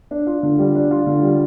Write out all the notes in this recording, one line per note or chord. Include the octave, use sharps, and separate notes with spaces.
D4
F4
D3
G3
D4
F4
D3
G3